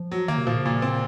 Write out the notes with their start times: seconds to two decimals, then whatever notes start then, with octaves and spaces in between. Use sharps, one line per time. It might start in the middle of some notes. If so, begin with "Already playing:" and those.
Already playing: F3
0.12 F#3
0.28 D#3 A#3
0.38 C3
0.47 A#2 F3
0.56 C#3
0.65 A#2
0.82 C4